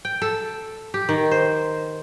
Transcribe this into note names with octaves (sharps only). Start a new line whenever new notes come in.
G5
A4
G4
D#3
C5